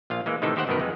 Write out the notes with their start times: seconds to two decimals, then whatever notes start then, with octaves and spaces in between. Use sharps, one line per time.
0.10 A#1 F4 F5
0.26 E3 G#3 A#3
0.42 A2 C3 D#3 E3 D#4 A4
0.56 D#2 D#3 G4 C5 F#5
0.67 G1 F#2 B2 D#3 A#4 B4
0.80 F2 G#3